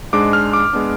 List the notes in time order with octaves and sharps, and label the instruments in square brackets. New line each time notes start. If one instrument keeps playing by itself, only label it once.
[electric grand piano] G#2 G#3 D4 D6
F6
D6
G#3 B3 D4